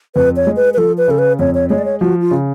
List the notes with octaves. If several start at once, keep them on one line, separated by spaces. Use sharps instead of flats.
F2 B4
C#5
G#3
B4
B4
F3 A4
B4
C#3 A4
B4
F2 C#5
C#5
G#3 C#5
D5
C#5
F3 F#4
F4
C#3